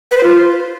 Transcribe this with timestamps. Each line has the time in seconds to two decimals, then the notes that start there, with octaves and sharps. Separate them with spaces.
0.11 B4
0.17 C5
0.23 F4